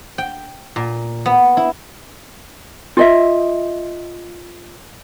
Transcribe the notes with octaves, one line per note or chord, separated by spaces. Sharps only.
G5
A#2
B3
E4
F4 D#5 E5